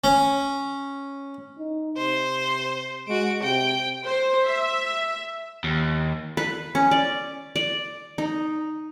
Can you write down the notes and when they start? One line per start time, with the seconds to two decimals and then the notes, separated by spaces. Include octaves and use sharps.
0.04 C#4
1.59 D#4
1.97 C3 C5
3.08 G#3 F#4 D7
3.43 C3 G5
4.06 C5
4.46 E5
5.64 D#2
6.37 B4
6.75 C#4
6.91 D5
7.56 D5
8.18 D#4